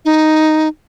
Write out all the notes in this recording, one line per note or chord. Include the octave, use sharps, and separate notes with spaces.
D#4